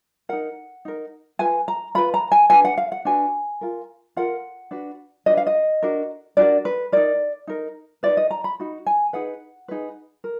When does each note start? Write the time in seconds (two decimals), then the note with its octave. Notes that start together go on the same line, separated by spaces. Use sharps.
0.29 D#4 A#4 F#5
0.85 D#4 A#4
1.39 F4 B4 G#5
1.68 A#5
1.95 F4 B4 B5
2.14 A#5
2.32 G#5
2.50 D4 F#4 B4 G#5
2.65 F#5
2.77 F5
2.92 F#5
3.05 D4 F#4 B4 G#5
3.61 F4 A#4
4.16 F4 A#4 F#5
4.71 D4 F#4 B4
5.26 D4 F#4 B4 D#5
5.37 F5
5.47 D#5
5.83 D4 F#4 A#4
6.37 D4 F#4 A#4 D5
6.65 B4
6.92 D#4 A#4 D5
7.47 D#4 A#4
8.03 D#4 F#4 B4 D5
8.17 D#5
8.31 A#5
8.44 B5
8.60 D#4 F#4
8.86 G#5
9.13 D#4 G#4 B4 F#5
9.68 D#4 G#4 B4
10.24 A#4